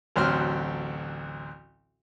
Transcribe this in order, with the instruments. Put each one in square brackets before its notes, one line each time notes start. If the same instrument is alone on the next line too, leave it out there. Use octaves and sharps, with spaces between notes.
[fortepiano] A1 D2 F#3 C4 F6